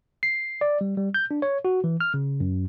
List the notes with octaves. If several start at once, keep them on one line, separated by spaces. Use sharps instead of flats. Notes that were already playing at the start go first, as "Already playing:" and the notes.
C7
D5
G3
G3
G6
D4
C#5
F#4
E3
F6
C#3
F#2